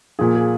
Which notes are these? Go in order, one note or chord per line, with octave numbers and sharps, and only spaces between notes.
A#2 F3 G#4
G#4